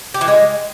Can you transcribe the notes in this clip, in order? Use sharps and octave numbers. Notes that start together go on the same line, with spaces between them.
G4
E3
G#3